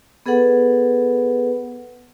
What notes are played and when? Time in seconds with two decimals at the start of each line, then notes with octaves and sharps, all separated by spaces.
0.26 B3 G#4 A4 B4 F#5